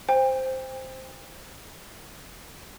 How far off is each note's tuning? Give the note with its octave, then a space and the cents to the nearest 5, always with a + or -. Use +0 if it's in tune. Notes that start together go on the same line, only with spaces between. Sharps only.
C5 +0 G5 +40